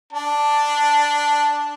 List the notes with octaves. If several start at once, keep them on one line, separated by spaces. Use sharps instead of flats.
D4 A5